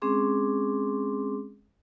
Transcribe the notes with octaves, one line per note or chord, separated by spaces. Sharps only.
G#3 C4 C#4 G#4 C6 D6